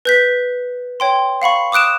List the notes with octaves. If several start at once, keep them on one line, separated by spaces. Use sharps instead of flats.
B4 G6 B6
C#5 G5 C6
F5 F#5 B5 C#6
D6 D#6 F#6 D7 E7